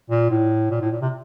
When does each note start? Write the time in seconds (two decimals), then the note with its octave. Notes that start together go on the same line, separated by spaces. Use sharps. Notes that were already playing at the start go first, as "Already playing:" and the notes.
0.10 A#2
0.30 A2
0.71 A#2
0.81 A2
0.92 A#2
1.01 C3